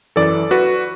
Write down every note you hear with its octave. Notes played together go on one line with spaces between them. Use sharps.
F#2 E3 A4 D5
F#4 B4